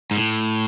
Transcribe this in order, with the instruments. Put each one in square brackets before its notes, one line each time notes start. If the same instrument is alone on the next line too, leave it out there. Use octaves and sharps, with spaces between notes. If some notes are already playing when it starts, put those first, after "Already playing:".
[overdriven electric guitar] G#2
A2